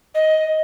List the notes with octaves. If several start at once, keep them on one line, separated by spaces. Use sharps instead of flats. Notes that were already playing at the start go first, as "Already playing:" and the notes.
D#5